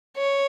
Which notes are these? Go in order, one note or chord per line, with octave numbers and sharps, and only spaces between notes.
C#5